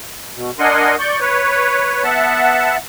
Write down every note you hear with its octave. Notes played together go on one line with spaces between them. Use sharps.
B2
D4 A#4 D#5 F#5 G#5 C6
D5 C#6 G6
B4 C#5
B3 E5 F#5 A5